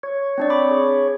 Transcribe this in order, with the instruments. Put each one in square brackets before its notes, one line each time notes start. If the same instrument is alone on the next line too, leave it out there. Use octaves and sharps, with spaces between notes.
[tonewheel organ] C#5
[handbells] C4 D4 D5
B5 D6
G#4